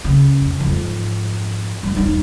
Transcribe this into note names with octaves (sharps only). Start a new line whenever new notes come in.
C#3
F2
F2 G#2
G3
E1 D#4